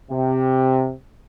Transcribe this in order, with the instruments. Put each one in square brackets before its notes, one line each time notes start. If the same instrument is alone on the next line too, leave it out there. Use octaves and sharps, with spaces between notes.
[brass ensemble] C3